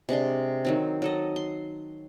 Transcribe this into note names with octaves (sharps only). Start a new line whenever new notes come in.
C3 G#3 D4 C6
D#3 F#3 C4
F#3 A4 D#5
C6